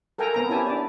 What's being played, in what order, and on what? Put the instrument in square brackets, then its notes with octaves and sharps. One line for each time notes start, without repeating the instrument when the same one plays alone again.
[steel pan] A4 A#4 G5 G#5 A#5
B3 C4 A#5
C#4 E4 G4 G#5 A5
D4 D5